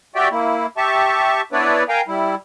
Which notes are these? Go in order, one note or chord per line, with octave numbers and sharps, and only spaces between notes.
F#4 G4 D5 E5 G5
A#3 E4
G4 E5 A5 C#6
B3 D4 E4 B4 C#5 D5
A#4 F5 G5 G#5 A#5
G3 E4